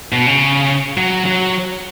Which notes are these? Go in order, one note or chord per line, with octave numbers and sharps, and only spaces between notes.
B2
C#3
F#3
F#3